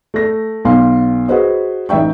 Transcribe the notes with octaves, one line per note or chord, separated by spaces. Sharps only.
A3 A#6
B1 F5 C6
F#4 G#4 B4 C5 D#5
A1 D#4 E5 G5 C#6